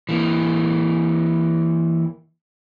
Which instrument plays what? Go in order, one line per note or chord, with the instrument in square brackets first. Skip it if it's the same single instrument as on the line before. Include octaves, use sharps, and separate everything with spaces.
[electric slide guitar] E3 A#3